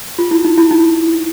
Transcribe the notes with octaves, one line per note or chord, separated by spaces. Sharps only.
F4
E4
D#4
E4
D#4